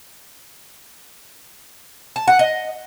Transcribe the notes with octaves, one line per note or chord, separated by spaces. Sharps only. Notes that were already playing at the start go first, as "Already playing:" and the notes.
A5
F#5
D#5